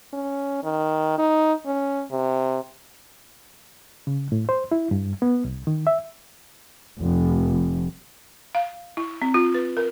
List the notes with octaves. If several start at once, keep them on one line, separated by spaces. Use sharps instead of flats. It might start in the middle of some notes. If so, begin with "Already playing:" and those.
C#4
D#3
D#4
C#4
C3
C#3
A2
C5
E4
G2
B3
C2
D#3
E5
F1
F5
E4
C4
F4
B4
A#4